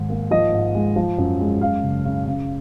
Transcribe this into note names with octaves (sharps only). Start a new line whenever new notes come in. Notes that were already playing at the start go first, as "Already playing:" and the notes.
Already playing: G#2 D#3 G#3
A#3
F3 D#5
G#2
G#3
F3
F#2
G#3
F#2 F5
F#1
C#3
C#3